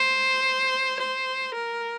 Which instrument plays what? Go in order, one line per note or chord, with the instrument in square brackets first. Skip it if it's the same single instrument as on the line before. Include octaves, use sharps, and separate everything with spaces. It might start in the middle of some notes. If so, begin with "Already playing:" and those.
Already playing: [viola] C5
C5
A#4